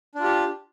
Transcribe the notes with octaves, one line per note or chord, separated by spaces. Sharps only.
D4 F4 G4